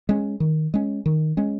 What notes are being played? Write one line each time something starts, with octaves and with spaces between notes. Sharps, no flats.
G#3 C#4
D#3
G#3 C#4
D#3
G#3 C#4